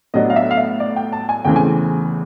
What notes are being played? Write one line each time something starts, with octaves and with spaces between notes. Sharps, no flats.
A2 F#3 B3 D4 D#5
F5
E5
F5
E5
D5
G5
A5
G#5
E2 C#3 E3 A3 C4 G5
G#5